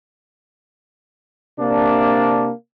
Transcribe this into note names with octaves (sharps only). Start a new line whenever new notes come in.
C3 A#3 D4